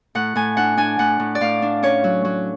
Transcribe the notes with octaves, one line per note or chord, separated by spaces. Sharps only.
A2 F#5
A2 G#5
D4 F#5
D4 G#5
A2 F#5
A2
D5
A2 F5
D4
C#4 C#5
F#3
F#3